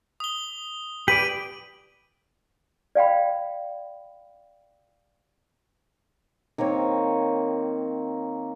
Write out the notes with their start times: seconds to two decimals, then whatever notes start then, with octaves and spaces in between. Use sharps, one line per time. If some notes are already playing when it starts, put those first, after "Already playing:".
0.20 D#6 G7
1.08 G4 B4 D5 D#7 F#7
2.95 D5 F5 G5 B5
6.58 D#3 A#3 C4 C#5